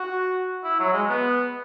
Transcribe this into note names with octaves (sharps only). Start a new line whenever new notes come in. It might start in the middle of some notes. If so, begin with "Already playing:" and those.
Already playing: F#4
E4
F#3
G#3
B3